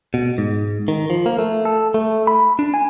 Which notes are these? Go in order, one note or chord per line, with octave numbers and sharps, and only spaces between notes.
B2
G#2
D#3
F3
A#3
A3
A4
A3
B5
D4
G#5